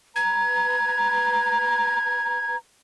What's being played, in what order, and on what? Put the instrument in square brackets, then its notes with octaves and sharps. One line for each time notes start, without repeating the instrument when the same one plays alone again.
[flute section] B4 A#5 [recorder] G#6